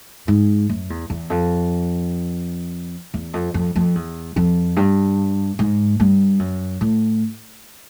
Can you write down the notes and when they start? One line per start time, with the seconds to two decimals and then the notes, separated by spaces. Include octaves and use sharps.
0.28 G#2
0.70 F#2
0.90 E2
1.10 E2
1.30 F2
3.14 E2
3.34 F2
3.54 F2
3.76 F2
3.95 E2
4.36 F2
4.77 G2
5.59 G#2
6.00 G2
6.39 F#2
6.81 A2